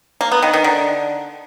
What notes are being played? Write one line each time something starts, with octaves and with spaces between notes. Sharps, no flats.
A#3
B3
D#3
D#3
D3